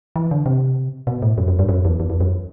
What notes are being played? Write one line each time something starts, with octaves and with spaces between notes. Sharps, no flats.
E3
D3
C3
B2
A2
F#2
F#2
G2
F#2
E2
E2
E2
F#2